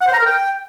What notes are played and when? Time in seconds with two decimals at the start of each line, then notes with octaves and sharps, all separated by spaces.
0.01 F#5
0.07 C5
0.13 A#5
0.19 A#4
0.25 G5